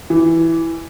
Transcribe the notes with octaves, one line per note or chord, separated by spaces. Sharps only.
E3